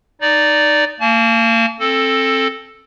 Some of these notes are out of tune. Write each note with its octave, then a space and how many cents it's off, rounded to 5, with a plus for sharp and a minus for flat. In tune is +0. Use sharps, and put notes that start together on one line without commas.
D#4 -15 D5 -5
A#3 -35 A5 -45
C4 +25 A4 +0